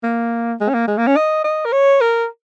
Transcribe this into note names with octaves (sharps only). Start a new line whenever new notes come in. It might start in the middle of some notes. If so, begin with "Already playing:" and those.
A#3
G#3
C#4
A#3
G#3
A#3
C#4
D#5
D#5
A#4
C#5
A#4